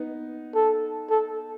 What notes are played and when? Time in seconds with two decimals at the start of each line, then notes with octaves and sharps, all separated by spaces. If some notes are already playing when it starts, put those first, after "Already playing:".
Already playing: B3 D#4
0.55 A4
1.11 A4